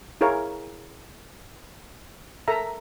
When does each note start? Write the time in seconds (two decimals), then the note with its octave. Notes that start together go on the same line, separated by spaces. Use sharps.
0.21 E4 G#4 A#4 C#5 F5
2.48 A4 A#4 E5 A#5